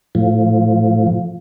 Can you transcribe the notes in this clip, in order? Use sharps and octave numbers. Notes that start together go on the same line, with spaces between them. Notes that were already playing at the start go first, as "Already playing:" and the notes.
A2 F3